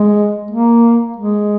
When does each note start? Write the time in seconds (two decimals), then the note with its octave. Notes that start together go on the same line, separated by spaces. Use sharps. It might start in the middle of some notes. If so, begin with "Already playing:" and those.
Already playing: G#3
0.51 A#3
1.17 G#3